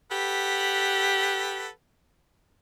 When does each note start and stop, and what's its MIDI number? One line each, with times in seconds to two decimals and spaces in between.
0.11 1.67 67
0.11 1.69 69
0.11 1.69 71
0.11 1.69 78